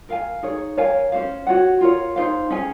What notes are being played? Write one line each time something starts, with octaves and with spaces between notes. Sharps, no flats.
A#4 F5 G#5
D#4 G#4 C#5
A#4 C#5 F5 G#5
C#4 F#4 C5 F5
F#4 C#5 F#5
F4 A#4 C#5
D#4 G#4 C5 F5
C#4 G#4 C#5 G#5